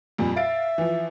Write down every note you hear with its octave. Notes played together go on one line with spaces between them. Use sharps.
F2 A#2 G3
E5 F5 A6 D7
E3 F3